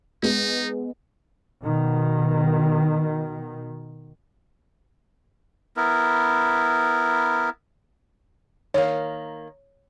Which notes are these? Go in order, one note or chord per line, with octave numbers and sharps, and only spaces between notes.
G#3 B3 D#4
B2 D#3
B3 E4 A#4
D#3 A#3 C#5